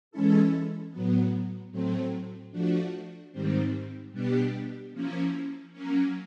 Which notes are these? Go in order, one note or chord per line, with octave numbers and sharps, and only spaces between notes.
E3 G#3 C#4 E4 A4
A2 F#3 B3
A2 F#3 A3 C4
F3 A3 D4 F#4
G#2 D#3 G3 C4
B2 G3 B3 D4 G4
F3 A#3 C#4 E4
F#3 A#3 C#4